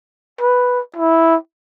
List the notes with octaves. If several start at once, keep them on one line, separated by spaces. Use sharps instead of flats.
B4
E4